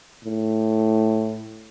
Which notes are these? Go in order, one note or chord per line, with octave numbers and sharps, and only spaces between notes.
A2